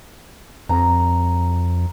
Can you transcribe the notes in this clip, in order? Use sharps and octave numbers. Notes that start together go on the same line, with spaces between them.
F2 A#5